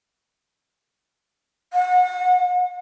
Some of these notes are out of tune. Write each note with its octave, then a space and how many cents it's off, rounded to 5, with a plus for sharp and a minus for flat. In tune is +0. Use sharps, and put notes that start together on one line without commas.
F#5 -30